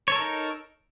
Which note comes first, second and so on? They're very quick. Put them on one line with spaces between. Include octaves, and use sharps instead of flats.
C#5 A4 A#4 D#4